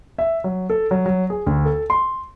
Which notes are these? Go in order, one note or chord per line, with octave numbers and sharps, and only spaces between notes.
E5
F#3
A4
F#3
F#3
G#4
D2
A4
C6